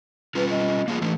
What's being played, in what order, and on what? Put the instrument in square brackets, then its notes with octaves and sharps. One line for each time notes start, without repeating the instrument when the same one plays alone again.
[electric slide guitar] G3 C#4 F4 [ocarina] B4
[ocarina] D#5
[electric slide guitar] A#3 F4 G#4
[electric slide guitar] E3 A3 [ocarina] D4